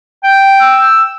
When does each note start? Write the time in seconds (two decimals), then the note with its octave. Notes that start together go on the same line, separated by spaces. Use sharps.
0.24 G5
0.61 E6